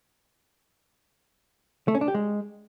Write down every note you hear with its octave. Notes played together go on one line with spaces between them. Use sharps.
A3
C#4
D4
G4
G#3